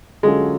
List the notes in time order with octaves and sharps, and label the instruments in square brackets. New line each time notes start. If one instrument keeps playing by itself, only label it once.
[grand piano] D3 F#3 C#4 F4 A4 [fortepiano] G#3